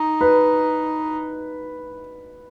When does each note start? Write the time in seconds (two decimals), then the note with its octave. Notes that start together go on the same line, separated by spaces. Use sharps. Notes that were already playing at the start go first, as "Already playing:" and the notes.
Already playing: D#4
0.21 B4